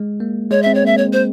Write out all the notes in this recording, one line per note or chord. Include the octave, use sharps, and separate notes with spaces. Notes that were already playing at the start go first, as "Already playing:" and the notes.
Already playing: G#3
A#3
G#3 C#5
C4 E5
C#5
A#3 E5
C#5
C5